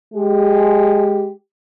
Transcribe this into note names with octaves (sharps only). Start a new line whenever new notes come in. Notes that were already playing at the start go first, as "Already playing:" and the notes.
G#3 G4